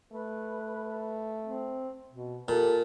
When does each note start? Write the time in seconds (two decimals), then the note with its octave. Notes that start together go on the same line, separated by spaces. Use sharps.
0.12 A3 B4
1.44 C4
2.12 B2
2.48 A#2 G4 A4